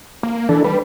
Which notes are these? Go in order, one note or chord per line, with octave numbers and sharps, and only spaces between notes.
A#3
E3 D4 A4
G3 B4